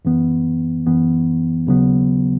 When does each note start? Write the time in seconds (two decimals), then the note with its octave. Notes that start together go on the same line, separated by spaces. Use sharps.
0.05 F#2 E3 B3
0.86 F#2 E3 B3
1.67 D#2 C#3 F#3 B3